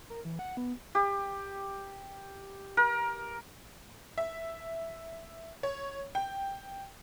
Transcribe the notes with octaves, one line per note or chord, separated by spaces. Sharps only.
A#4
E3
F#5
B3
G4
A#4
E5
C#5
G5